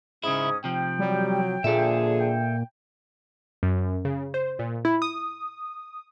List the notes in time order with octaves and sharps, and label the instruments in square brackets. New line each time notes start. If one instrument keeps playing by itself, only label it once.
[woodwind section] G#2 C#4 D#6 [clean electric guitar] C#3 E4
[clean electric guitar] C3 F3 [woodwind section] G5
[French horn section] F#3 [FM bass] G3
[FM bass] A#2 [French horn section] D3 F3 G#4 [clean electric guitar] A4 E5
[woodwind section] G5
[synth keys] F#2
C#3
C5
A#2
E4
D#6